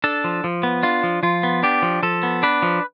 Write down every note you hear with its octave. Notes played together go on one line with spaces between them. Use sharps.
D4 A4
F3
F3
B3
D4 F4
F3
F3 F4
B3
D4 G4
F3
F3 A4
B3
D4 B4
F3